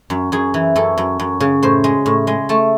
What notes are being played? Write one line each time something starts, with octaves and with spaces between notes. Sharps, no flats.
F#2
F#2 G#4
E3
F#2 A4
F#2
F#2
C#3
A2 C5
G#3
A2
G#3
A3 A5